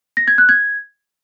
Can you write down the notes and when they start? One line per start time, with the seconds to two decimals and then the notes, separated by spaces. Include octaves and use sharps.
0.17 A#6
0.28 G#6
0.38 F#6
0.49 G#6